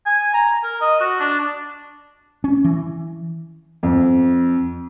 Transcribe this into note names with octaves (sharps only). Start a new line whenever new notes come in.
G#5
A#5
A#4
D#5
F#4
D4
C#4
E3
F2